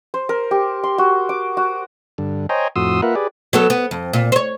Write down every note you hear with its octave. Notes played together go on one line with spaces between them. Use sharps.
C5
A#4
G4
C6
F#4
D6
F#4
G2 D3
C5 C#5 D#5 G5 G#5 A#5
F2 A2 F#4 C6 D#6 E6
A#3 F4 A#4 B4 E5 F#5
G4 G#4 B4 D5
F#3 B3 A4
B3
F2
A#2
C5 C#5